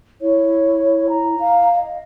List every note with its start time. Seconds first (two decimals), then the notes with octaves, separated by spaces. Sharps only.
0.22 E4 C#5
1.09 A#5
1.40 F5
1.74 D#5